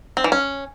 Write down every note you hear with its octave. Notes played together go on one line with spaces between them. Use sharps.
C4
E3
C#4